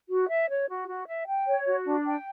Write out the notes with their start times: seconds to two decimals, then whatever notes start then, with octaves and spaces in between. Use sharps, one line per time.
0.10 F#4
0.29 E5
0.50 C#5
0.69 F#4
0.89 F#4
1.08 E5
1.28 G5
1.47 C#5
1.67 F#4
1.86 D4
2.06 G5